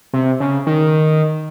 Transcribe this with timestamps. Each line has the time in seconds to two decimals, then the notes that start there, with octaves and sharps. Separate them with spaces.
0.13 C3
0.40 C#3
0.67 D#3